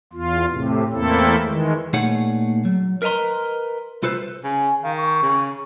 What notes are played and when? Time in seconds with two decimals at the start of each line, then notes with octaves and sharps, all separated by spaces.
0.13 E2 F4
0.50 A2 C3
0.93 E2 A3 A#3 C4 E4 A4
1.45 D#3 E3 G#3
1.93 A#2 A3 D#4 G#4 C#5 F#5
2.65 F#3
3.02 A#4 B4 D#5 A#5 C6
4.03 C2 F4 A4 B4 C5
4.44 C#3 G#5
4.83 D#3 F5
4.97 C#6
5.22 C#3